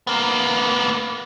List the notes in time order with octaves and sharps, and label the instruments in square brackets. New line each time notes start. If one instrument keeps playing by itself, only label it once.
[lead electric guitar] A#3 B3